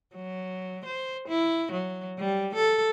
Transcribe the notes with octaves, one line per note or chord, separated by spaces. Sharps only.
F#3
C5
E4
F#3
G3
A4